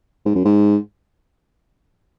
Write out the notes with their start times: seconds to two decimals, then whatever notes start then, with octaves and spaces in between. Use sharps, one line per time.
0.26 G#2
0.35 F#2
0.45 G#2